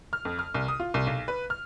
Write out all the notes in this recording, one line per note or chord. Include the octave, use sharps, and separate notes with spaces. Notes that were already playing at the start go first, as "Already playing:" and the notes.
F6
F2
F6
C2
D#6
F4
C2
B1
B4
F6